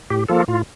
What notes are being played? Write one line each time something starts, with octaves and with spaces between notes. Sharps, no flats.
A2 G4
F3 A#3 F4 A4
A2 F4